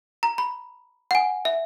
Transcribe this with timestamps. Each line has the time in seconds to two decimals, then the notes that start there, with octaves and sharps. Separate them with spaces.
0.23 A#5
0.38 B5
1.11 F#5
1.15 G#5
1.45 E5